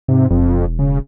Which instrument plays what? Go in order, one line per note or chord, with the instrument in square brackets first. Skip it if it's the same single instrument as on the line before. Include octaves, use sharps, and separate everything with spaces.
[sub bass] G#2 [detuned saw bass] C3
[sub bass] E1 [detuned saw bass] F2
[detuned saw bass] C#3